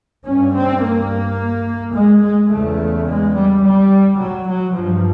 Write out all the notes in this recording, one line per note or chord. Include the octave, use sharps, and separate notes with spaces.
G2 C#4
C4
A#3
G#3
G#3
E2 C#3 A3
G#3
G3
G3
F#3
F#3
G2 F3